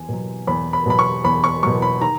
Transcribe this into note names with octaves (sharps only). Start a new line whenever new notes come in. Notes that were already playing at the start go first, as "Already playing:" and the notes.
Already playing: E2 G#5
B2 F#3
E2 B5
B5
B2 F#3 B5
C#6
E2 B5
C#6
B2 F#3 C#6
B5
D#3 A#5